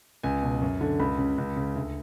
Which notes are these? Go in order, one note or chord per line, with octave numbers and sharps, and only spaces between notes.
C#2 G#5
B2
F#2
D3
C#2 B5
C#3
C#2
C#3
D2